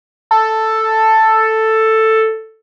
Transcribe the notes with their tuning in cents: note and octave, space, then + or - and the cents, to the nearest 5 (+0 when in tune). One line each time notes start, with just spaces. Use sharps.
A4 +5